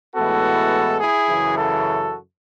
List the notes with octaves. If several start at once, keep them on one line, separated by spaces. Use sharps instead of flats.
A2 E3 G#3 B3 F#4 A4
E4 G#4
F#2 C#3 E3
F#4 A4